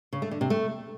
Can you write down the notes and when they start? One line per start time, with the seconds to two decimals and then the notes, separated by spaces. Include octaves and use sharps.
0.13 C#3
0.22 A3
0.31 D3
0.41 C3
0.50 A3